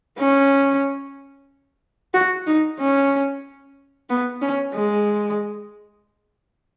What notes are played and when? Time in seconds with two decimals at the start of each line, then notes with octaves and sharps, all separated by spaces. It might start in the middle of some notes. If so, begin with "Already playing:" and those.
0.18 C#4
2.14 F#4
2.47 D#4
2.79 C#4
4.10 B3
4.41 C#4
4.74 G#3